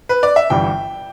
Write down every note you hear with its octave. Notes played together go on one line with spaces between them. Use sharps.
B4
D5
E5
G1 G2 E3 G5